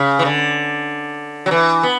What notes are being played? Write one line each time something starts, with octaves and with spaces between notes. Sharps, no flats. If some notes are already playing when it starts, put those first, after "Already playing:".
Already playing: C#3
E3
D3
F#3
E3
B3